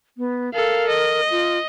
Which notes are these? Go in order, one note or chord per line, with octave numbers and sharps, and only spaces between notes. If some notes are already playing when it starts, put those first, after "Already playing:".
B3
A4 A#4 F5
D#5
F4